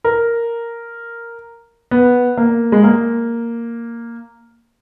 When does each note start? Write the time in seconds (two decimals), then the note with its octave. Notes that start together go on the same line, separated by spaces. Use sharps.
0.04 A#4
1.91 B3
2.37 A#3
2.72 G#3
2.84 A#3